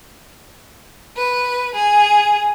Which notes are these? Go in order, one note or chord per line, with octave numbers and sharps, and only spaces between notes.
B4
G#4